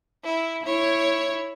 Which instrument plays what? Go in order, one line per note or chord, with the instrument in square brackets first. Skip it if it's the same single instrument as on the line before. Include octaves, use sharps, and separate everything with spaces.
[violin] E4
[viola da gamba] E4 [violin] C#5